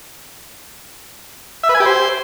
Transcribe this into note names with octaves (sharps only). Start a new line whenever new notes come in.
E5
B4
G#5
G4
C5